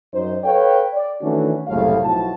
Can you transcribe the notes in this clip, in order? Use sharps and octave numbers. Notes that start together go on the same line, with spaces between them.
F#2 D#4 C5
A4 B4 C#5 F5 G5
D5
D#3 E3 A3 C#4 D4 F#4
F#1 C2 A2 F#3 A3 F5
B1 F3 E4 F#4 A5